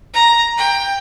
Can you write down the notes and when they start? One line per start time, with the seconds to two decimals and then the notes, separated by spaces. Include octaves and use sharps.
0.13 A#5
0.57 G5